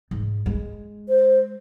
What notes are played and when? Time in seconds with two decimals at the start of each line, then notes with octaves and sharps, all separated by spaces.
0.11 G#2
0.46 G#3
1.08 C5